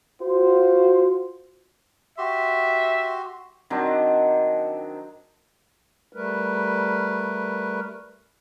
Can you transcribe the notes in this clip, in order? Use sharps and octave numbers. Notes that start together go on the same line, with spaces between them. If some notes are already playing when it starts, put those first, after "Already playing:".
F4 F#4 C5
F#4 G4 E5 C6
D#3 F#3 C4 D4
G3 A3 A#4 B4